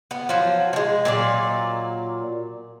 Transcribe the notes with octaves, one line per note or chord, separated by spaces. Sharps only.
B3
F3 F#3
E3 G#3
A#2 F#3 D5